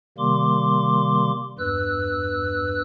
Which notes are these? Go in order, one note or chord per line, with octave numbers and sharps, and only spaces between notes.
C3 D#3 G3 A#3 C6 D6
E2 G2 B4 E6 F#6